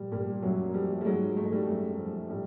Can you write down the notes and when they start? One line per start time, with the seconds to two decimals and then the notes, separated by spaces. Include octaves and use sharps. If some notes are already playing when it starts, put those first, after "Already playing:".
Already playing: A#2 F3 G3
0.11 A#2 G3
0.42 F#2 F#3
0.73 F3 G3
1.01 G3
1.05 G#2 F#3 G#3
1.36 G#2 A3
1.45 G#3
1.52 G3 A3
1.67 F#2
1.99 F3
2.30 A2 G3